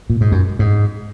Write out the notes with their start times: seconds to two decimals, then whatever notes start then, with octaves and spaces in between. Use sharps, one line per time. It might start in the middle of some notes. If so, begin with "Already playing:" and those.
0.10 A#2
0.21 G#2
0.32 F#2
0.59 G#2